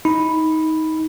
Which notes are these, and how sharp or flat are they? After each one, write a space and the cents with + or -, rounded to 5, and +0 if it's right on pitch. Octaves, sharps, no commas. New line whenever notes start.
D#4 +20 B5 +0